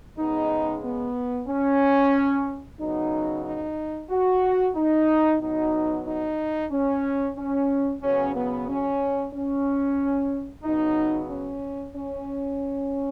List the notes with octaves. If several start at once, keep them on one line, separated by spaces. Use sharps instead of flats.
C#3 G#3 B3 D#4
B3
C#4
C#3 F#3 B3 D#4
D#4
F#4
D#4
B2 F#3 B3 D#4
D#4
C#4
C#4
C#3 F#3 B3 C#4
B3
C#4
C#4
C#3 F#3 B3 D#4
C#4
C#4